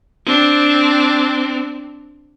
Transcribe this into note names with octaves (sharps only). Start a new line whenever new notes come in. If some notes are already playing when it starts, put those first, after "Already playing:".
C4 D4